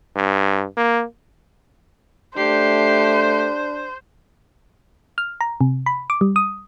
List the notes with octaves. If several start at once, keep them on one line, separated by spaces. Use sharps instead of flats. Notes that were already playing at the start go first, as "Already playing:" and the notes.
G2
A#3
A3 D4 G4 C5 C7
F6
A#5
C3
B5
D6
G3
D#6